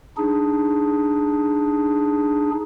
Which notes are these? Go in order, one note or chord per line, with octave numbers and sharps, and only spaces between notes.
D4 D#4 G#4